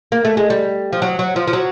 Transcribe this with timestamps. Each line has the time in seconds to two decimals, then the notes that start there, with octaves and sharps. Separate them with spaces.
0.12 A#3
0.25 A3
0.37 G#3
0.50 G3
0.93 F3
1.02 F#3
1.19 F#3
1.36 F3
1.47 F3
1.53 F#3